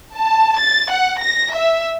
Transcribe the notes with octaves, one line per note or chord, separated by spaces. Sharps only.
A5
A6
F#5
A#6
E5